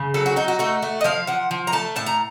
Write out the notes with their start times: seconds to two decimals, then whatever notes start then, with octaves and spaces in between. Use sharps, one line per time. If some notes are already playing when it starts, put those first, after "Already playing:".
Already playing: C#3
0.14 F#3 A4
0.26 F#4
0.36 D#4 F#4
0.48 F#4
0.59 A3 F#4
0.82 A3
1.01 D#5
1.04 F3 F5
1.27 F3 F#5
1.51 F3
1.67 A#5
1.73 A3 A5
1.96 A2 A5
2.06 A#5